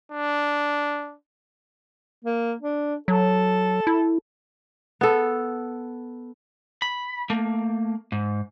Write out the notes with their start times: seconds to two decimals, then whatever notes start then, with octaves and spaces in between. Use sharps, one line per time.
0.12 D4
2.25 A#3
2.61 D4
3.08 F#3 A4
3.87 E4
5.01 B3 A4
6.82 B5
7.30 A3 A#3
8.12 G#2